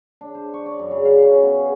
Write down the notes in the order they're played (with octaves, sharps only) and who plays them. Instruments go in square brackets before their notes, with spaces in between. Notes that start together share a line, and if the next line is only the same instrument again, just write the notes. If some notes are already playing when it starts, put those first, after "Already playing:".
[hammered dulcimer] D4
C5
C#6
D5
F#2
C#3
F5
C#4
B3
G#4